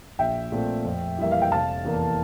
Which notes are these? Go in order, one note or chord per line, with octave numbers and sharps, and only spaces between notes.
A#1 E5 G5
A#2 A3 C4
F2
E3 G3 A#3 E5
F5
G5
F1 F5 A5
E2 E3 A#3